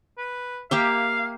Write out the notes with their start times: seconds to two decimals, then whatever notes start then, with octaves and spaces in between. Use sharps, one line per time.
0.18 B4
0.71 A#3 G4 E5 F5